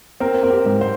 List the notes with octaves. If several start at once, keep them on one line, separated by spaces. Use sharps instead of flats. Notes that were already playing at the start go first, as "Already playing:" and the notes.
C4 A#4
C4
G4
G#2
C5